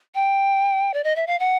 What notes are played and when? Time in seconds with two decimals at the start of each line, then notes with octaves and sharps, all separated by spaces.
0.15 G5
0.94 D5
1.04 D#5
1.16 E5
1.27 F5
1.40 F#5